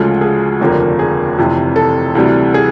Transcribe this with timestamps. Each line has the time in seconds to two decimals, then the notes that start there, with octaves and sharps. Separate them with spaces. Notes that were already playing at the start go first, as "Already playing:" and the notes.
Already playing: D2 C#3 F3 G#3 A4
0.21 G#4
0.61 F1 D#2 D3 F3 A#3
0.99 G#4
1.38 F1 F2 C3 E3
1.76 A4
2.15 D2 C3 E3 G3
2.54 G#4